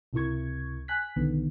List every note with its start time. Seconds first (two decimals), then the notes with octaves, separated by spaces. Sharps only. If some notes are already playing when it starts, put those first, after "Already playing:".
0.13 C#2 C3 E4 A#4 C#6 G#6
0.88 G#5 F#6 B6
1.16 B1 D3 D#3 B3